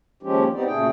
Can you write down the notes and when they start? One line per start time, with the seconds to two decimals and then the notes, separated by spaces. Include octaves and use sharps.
0.23 D#2 F3 G#3 C#4 G4
0.53 B3 C4 D#4 G4 D5
0.66 D2 A#2 C#3 A3 G#4 G5